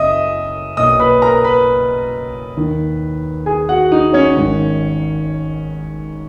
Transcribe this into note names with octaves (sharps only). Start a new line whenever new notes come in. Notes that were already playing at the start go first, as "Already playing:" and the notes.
Already playing: F#1 F#2 D#5 E5 D#6
B1 A#2 D#5 D#6
B4 B5
A#4 A#5
B4 B5
D#2 D#3
G#4 G#5
F#4 F#5
D#4 D#5
C#4 C#5
G#1 G#2 D#3